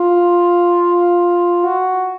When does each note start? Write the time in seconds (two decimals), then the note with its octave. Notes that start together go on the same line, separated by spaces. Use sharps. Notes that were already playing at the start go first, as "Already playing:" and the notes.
Already playing: F4
1.65 F#4